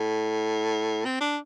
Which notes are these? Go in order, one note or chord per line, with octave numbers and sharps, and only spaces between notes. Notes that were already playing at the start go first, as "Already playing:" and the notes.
Already playing: A2
C4
D4